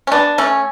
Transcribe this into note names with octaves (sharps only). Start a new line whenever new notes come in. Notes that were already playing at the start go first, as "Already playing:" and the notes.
C#4
B3 D4
A3 C#4